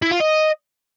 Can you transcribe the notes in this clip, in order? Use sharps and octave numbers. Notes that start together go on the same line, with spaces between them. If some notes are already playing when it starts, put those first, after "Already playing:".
E4
F4
D#5